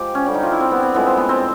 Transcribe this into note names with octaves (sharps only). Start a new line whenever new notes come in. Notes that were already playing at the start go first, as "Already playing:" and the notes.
Already playing: F3 G#3 G4
C#4
D3 G3 C#4
D#4
F4
E4
C4
B3
C4
A2 F3 G#3 B3
C4
B3
C4